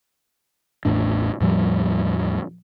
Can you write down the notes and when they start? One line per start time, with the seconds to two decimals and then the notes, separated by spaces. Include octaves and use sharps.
0.85 A1 E2 A2 D4
1.40 E2 A2 F3 G3